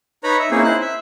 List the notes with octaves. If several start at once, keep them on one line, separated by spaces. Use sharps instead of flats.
D#4 B4 C#5 A#5 B5
E5
A#3 C4 C#4 D#4 E4 G#4
E4 C5 F#6
E5